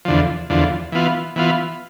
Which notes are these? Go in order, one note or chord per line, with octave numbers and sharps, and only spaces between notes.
E2 D3 F3
E2 D3 F3
E3 B3 F4
E3 B3 F4